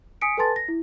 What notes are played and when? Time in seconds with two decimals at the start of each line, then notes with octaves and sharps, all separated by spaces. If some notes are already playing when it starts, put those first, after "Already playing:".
0.21 G#5 D#6 B6 C#7 D7
0.37 A4 B4 G#5 A5 C6 A6
0.56 A#6
0.68 E4